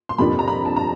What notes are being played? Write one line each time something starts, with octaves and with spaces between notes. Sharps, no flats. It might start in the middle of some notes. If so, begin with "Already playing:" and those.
C6
F2 C3 F3 A#3 D4 B5
A#5
B5
A5
A#5